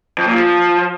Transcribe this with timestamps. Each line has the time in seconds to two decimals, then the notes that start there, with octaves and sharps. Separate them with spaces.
0.18 F2
0.26 A#2
0.35 F3